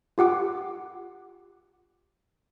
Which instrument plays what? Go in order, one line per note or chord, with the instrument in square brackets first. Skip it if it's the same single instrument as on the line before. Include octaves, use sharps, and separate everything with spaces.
[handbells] F4 G4 F#5 D6